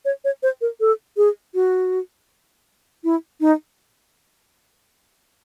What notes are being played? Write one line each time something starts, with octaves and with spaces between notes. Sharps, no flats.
C#5
C#5
C5
A#4
A4
G#4
F#4
E4
D#4